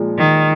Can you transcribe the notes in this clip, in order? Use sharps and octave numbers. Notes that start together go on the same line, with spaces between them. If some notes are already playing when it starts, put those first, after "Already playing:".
Already playing: A#2 F3 G#3
D#3